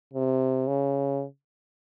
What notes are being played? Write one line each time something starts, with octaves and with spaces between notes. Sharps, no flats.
C3
C#3